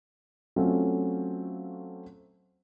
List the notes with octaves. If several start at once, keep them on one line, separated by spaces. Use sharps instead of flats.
F#3 A3 C4 C#4 F4